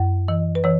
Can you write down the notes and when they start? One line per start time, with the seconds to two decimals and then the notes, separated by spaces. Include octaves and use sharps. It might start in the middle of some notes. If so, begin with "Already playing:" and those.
Already playing: F#2
0.28 E3 D#5
0.55 B4
0.64 E3 C#5